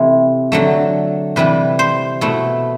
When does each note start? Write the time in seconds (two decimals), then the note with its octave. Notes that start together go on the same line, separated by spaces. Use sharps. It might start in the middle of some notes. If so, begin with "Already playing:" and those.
Already playing: C3 E3 A3 C4 E4
0.52 D3 F#3 A3
1.36 C3 E3 G3 B4
1.79 C5
2.21 B2 A3 E4